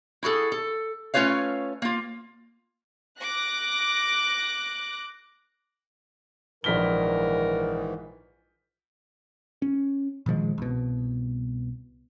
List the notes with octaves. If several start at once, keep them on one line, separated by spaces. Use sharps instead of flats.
E4 F#4 G#4 A4
A4
A3 C#4 F4 B4 C#5 F5
A#3 F4
D6 F#6 A#6
A#1 G#2 D#3 E3 A#4 B6 G7
C#4
A#2 D#3 F3 G#3
C2 B2